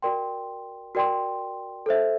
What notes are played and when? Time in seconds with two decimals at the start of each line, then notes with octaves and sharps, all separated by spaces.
0.02 F#4 A#4 D5 G5 C6
0.95 F#4 A#4 D5 G5 C6
1.86 A4 C5 E5